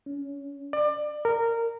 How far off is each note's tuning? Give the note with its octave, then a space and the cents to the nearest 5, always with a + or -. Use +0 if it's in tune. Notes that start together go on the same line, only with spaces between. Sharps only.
C#4 +20
D5 +25
A#4 -15